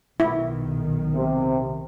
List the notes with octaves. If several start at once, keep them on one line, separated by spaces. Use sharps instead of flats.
B1 D#3 E4
C3